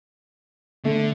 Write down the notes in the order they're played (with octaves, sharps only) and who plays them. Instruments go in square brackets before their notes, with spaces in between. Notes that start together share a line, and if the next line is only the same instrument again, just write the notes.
[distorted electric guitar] D3 [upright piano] A3